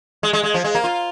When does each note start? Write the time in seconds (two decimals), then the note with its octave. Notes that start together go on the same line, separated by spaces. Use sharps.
0.23 G#3
0.33 G#3
0.43 G#3
0.54 F3
0.64 G#3
0.75 A#3
0.84 F4